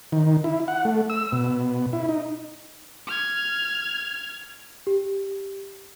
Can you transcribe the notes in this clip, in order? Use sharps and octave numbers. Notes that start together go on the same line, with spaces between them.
D#3
E4
F#5
A3
E6
B2
E4
D#4
F6 G#6
G4